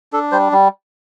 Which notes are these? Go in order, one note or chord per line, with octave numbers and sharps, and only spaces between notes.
D4 A4
G3 C5
G3